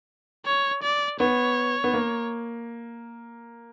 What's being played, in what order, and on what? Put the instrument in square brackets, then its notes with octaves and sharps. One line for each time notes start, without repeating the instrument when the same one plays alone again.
[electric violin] C#5
D5
[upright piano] B3 [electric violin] C#5
[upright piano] B3
A#3